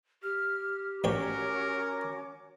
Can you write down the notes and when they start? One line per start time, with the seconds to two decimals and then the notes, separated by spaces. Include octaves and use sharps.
0.23 G4 F6
1.04 A1 C#4 F#4 A#4 C#5 G5 D6